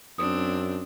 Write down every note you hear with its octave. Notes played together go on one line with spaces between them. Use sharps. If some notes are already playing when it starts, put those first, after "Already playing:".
F#2 C4 D4 D#6